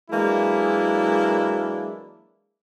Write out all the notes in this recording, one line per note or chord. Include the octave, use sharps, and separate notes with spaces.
E3 F#3 G#3 A#3 D4 E4